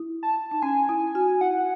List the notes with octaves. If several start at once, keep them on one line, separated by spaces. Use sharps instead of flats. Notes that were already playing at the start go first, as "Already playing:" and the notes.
Already playing: E4
A5
D#4
C#4 G#5
E4
F#4
E4 F#5